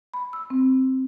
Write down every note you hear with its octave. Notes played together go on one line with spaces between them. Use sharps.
B5
E6
C4